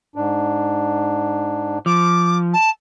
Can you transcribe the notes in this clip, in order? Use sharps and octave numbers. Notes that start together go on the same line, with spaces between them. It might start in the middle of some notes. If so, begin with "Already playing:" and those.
G#2 D4
F3 D6
A5